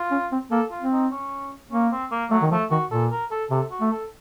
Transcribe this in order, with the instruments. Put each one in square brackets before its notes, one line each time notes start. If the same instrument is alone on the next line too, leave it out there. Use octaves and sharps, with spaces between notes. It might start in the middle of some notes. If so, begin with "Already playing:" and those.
Already playing: [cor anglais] F4
[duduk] C#4
C4
[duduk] A#3 [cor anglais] A4
[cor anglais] F4
[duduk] C4
[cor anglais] D#4
C#4
[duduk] A#3 [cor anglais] C#4
[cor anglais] C4
A#3
[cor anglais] F#3 [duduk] A3
[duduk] D#3
[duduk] F3 [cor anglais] A3
[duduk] D#3 [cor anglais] F#4
[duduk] A#2 [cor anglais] A4
[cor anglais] A#4
A4
[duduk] C3 [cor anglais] A4
[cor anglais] F#4
[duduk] A3
[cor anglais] A4